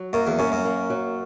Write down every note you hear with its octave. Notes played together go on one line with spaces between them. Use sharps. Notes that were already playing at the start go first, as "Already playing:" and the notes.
Already playing: F#3
F#2 A#3
E2
F#2 C#4
F#2
A#3
F#3